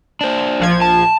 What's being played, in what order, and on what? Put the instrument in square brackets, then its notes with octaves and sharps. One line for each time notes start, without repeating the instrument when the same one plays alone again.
[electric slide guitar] D4 C5
[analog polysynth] A#1 F3 G#6
[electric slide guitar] A5